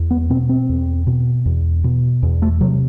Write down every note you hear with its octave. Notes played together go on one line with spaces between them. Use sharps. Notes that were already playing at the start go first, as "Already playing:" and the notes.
Already playing: E2
B3
B2 C4
C4
E2
B2
E2
B2
E2
A3
C3 F#3